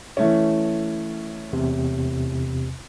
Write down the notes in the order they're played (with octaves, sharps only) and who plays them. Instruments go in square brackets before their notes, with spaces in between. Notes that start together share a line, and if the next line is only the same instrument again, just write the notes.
[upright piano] E3 A3 C#4
[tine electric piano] E2 C3